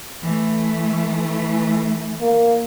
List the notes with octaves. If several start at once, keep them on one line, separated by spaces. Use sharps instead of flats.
E3 A3
A#3